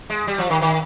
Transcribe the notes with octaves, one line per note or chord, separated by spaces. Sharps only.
G#3
G3
F3
D#3
D#3